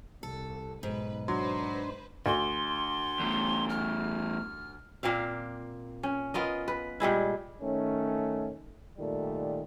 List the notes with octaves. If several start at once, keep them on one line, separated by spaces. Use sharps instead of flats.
C2 A4
B1 G#2 B4
F#3 D4 B4 C5 C6
D2 C6
E2 A2
F6
A#2 A#3 C4 F5
C#4
B3 F4 A#4 D#5
B4
A#2 G3 G#3 E4
D#3 A3 C#4
A#2 D#3 G3 A3